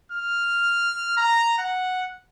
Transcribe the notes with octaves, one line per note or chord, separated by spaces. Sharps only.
F6
A#5
F#5